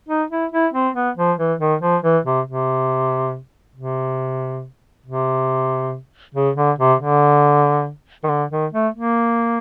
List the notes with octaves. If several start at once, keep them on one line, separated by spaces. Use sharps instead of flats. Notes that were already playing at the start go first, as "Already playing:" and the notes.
D#4
E4
E4
C4
B3
F3
E3
D#3
F3
E3
C3
C3
C3
C3
C#3
D3
C3
D3
D#3
D3
D#3
A3
A#3